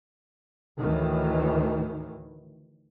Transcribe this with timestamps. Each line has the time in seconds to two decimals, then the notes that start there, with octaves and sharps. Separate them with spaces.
0.77 D2 A2 D#3 E3